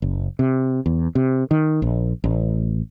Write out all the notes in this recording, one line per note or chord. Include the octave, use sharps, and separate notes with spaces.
F#1
C3
E2
C3
D#3
A#1
A1